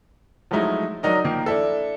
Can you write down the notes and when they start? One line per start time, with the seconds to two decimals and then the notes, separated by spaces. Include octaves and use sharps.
0.51 F3 F#3 G#3 A3 D#4 E4
1.03 F#3 D4 D#4 A#4 D#5
1.25 D#3 F3 A#3
1.46 D4 E4 A4